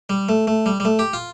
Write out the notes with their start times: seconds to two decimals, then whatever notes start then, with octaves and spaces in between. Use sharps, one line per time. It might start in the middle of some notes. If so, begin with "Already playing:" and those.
0.09 G3
0.29 A3
0.47 A3
0.66 G3
0.80 G3
0.85 A3
0.99 G4
1.13 F4